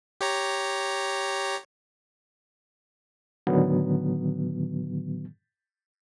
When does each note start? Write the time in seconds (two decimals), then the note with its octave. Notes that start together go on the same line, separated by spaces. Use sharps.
0.21 G4 C#5 A#5
3.47 A2 D3 D#3 F#3 B3